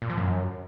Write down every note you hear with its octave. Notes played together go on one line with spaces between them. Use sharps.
A#2
F3
F#2